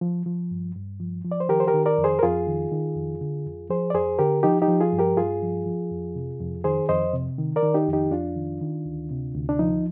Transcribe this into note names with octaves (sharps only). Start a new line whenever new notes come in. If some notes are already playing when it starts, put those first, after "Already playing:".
F3
F3
G2
G2
F3
F3
D5
C5
D#3 G4 A#4
C5
G4 A#4
D#3
A#4 D5
F2
G#4 C5
A#4
F2 F4 G#4
D#3
D#3
F2
D3
F2
F3 G#4 C5
D5
F2 G#4 C5
D3 G4 A#4
F3 D#4 G4
D#4 G4
F3
F4 G#4
G2
G4 A#4
G2 F4 G#4
F3
F3
F2
C3
F2
D#3 G#4 C5
F2 C5 D#5
C3
D#3
A#4 D5
D#3
D#4 G4
F2
D#4 G4
F2 D4 F4
D#3
D#3
D2
C3
D2
D4
F3 D#4